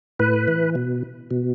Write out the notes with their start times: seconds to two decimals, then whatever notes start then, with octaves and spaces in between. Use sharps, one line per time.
0.20 A2 B4
0.48 E3
0.75 B2
1.31 B2